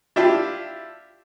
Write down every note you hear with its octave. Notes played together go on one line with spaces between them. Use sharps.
D4 E4 F4 G4